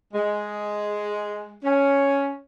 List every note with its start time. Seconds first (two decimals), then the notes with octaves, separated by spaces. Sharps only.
0.14 G#3
1.64 C#4